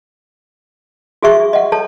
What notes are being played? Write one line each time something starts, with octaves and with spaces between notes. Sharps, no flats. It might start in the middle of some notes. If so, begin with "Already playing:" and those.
F#4 G#4 E5 C#6
D#5 F#5
A4 C#5 A5